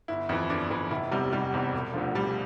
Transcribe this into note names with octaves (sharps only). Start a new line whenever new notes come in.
G1 E4
F2 E3
G1 D4
F2 E3
F1 E4
E2 C3 G3
F1 G3
E2 C3
E1
D2 D3 F3
E1 G3